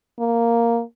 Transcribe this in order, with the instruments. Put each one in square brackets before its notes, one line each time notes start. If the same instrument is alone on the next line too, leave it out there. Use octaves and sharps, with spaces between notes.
[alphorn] A#3